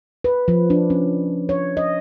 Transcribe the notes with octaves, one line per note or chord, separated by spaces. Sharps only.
B4
F3
D4
C#4
C#5
D#5